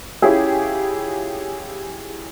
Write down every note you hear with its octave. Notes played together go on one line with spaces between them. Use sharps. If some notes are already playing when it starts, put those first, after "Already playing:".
C#4 E4 F4 G4 G#4